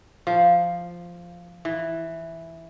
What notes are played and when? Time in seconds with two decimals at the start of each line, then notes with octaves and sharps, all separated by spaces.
0.27 F3
1.65 E3